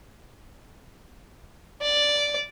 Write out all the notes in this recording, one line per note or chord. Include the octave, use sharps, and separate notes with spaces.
D5